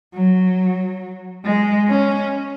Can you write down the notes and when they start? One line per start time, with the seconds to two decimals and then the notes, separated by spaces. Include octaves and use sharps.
0.14 F#3
1.45 G#3
1.89 C#4